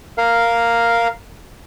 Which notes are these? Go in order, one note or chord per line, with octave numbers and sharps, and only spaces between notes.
A#4 F5